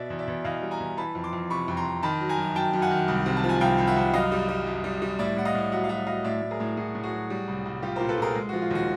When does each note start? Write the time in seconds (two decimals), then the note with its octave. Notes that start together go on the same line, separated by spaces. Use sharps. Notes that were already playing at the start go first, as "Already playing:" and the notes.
Already playing: B2 D5 E5
0.10 E2
0.19 D5 E5
0.27 E2
0.44 E2 D#5 F5
0.62 G3
0.71 G#5 A#5
0.80 E2
0.97 E3 A5 B5
1.15 F2
1.24 C6 D6
1.33 F2
1.50 C3 B5 C#6
1.68 F2
1.77 A#5 C6
1.85 F2
2.03 D#3 A5 B5
2.21 F#3
2.29 G#5 A#5
2.38 F#2
2.56 F#2 G5 A5
2.73 F#2
2.82 F#5 G#5
2.91 D#3
3.08 C2
3.26 C3
3.37 A5
3.43 F3
3.49 G#5
3.61 C2 F5 G5
3.78 C2
3.87 E5 F#5
3.96 C2
4.14 F#2 D#5 F5
4.32 G3
4.49 G3
4.67 F#2
4.84 G3
5.02 G3
5.19 A2 D5 E5
5.36 A2 F#5
5.45 D#5 F5
5.54 A2
5.72 F#3 E5 F#5
5.84 F5
5.89 F#3 E5 F#5
6.07 F#3 D#5 F5
6.24 A2 D5 E5
6.42 A2
6.51 G#4 A#4
6.60 A2
6.77 A2 F#4 G#4
6.95 A2
7.03 F#4 G#4
7.13 F#3
7.30 G3
7.48 C2
7.65 C2
7.82 G3 F4 G4
7.96 A#2 A#4 C5
8.09 A4 B4
8.18 A#2 G#4 A#4
8.35 G#3
8.49 F3 F#4
8.62 F4
8.71 D#2 F#4